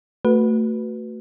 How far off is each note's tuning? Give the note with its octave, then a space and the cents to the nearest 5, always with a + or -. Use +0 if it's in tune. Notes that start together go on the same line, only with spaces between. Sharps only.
A3 +25 F#4 +0 B4 +0